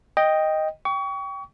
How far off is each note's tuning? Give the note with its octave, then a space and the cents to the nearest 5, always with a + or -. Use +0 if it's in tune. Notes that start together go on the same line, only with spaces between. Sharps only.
D#5 +0 G5 +5
G5 +0 C#6 +35